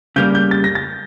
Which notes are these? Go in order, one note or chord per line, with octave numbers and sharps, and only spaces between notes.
C#3 G3 A#3 G6
G6
A6
A#6
A6